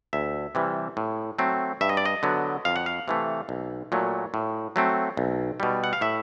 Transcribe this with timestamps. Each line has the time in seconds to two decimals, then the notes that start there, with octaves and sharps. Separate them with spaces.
0.13 D2 E5
0.55 C3 E3 G3
0.97 A2
1.39 F#3 A3 C4
1.81 G2 E5
1.89 D#5
1.97 D5
2.05 D#5
2.23 D3 F#3 B3
2.65 F2 F5
2.76 F#5
2.86 F5
3.08 C3 E3 A3
3.49 B1
3.92 A#2 F#3 A3
4.34 A2
4.76 F#3 A3 C4
5.17 B1
5.60 B2 G3
5.84 F#5
5.93 F5
6.01 A2 E5